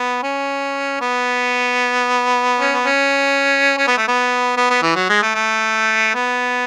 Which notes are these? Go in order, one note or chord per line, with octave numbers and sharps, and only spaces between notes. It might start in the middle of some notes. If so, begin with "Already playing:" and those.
Already playing: B3
C#4
B3
C#4
B3
C#4
C#4
B3
A3
B3
B3
B3
E3
F#3
G#3
A3
A3
B3